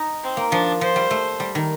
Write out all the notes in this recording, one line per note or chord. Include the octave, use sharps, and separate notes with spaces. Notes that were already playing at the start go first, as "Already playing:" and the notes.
Already playing: D#4
C4
A#3
F3 D4
F3 C5
G3
A3
G3
D#3